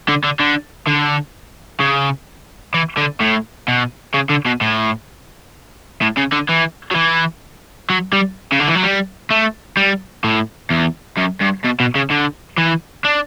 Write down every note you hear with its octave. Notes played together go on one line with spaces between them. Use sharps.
D3
D3
D3
D3
C#3
E3
D3
A2
B2
C#3
D3
B2
A2
A2
C#3
D3
E3
F#3
E3
F#3
G3
C#3
D3
E3
F#3
G3
A3
G3
A2
E2
F#2
G2
B2
B2
C#3
D3
E3
D4